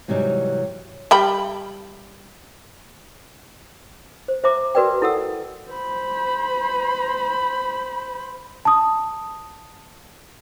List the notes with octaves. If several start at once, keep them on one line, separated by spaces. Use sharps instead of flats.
G#2 C3 E3 F#3 G3 D#4
G3 G5 B5
C5
C5 E5 A#5 D6
F#4 A#4 B4 D5 G5
E4 A4 F#5 E6
C5 B5
A5 D#6